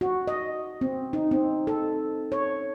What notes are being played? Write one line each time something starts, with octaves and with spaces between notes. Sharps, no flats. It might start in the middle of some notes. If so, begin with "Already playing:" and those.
F#4
D#5
C4
D#4
C4
A4
C#5